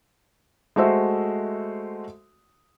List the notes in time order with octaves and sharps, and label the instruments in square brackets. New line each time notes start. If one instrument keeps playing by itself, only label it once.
[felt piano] G#3 A3 F#4 C5 E5